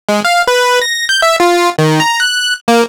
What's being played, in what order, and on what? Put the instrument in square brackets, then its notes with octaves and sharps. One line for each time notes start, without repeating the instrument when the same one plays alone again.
[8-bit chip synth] G#3
F5
B4
A#6
G6
E5
F4
D#3
A#5
F#6
A#3